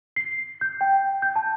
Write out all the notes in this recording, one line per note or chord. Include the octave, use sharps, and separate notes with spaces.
C7
G6
G5
G6
A5